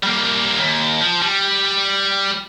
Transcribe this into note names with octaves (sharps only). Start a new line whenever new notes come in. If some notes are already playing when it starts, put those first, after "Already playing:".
G3 A#3
D#2
F3
G3